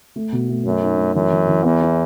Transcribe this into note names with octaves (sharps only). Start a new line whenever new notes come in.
A3
B2
A3
F#2 A3
D#4
A3
F#2 E3
E3
E3
E2 B3
E4